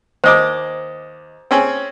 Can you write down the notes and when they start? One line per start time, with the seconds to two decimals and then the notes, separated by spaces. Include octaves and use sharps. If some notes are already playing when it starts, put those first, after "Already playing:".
0.24 D#2 C5 D#5 D6
1.51 C4 C#4 G#4